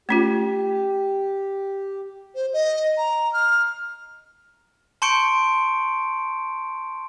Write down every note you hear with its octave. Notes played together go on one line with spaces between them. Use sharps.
A3 C#4 F4 G4
C5
D#5
A#5
F6
A5 C6 C#6 G6 C#7 D7